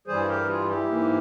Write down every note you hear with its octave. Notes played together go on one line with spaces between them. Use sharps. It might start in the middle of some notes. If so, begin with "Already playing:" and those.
G2 E3 G3 G#4 C5
G4 A#4
F4 G#4
E4 G4
G#2 E3 A#3